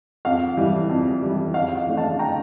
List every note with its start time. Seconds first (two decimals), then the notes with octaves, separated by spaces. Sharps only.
0.25 F2 F5
0.57 E3 G3
0.89 F2
1.22 E3 G3
1.54 F2 F5
1.76 F5
1.87 E3 A3 D4
1.97 F5 A5
2.19 G5 A#5